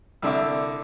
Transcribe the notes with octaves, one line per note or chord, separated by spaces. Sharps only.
C2 D3 E5 D6